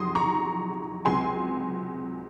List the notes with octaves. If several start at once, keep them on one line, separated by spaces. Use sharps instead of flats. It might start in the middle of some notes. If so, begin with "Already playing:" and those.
Already playing: F2 F#3 C6 D#6 A#6
A#5 C#6
C#2 C3 F#3 G#5 C6